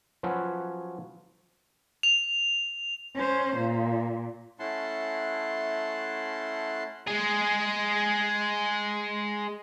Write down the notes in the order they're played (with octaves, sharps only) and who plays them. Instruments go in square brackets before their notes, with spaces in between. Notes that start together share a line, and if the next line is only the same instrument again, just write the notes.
[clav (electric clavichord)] F3 F#3 C#4 F#4 B4
[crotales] F7
[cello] C#4 C5
A#2
[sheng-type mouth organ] A3 C#4 E4 F#5 A5 C6
[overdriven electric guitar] G#3 G#4